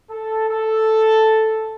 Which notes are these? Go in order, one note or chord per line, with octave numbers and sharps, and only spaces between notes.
A4
A4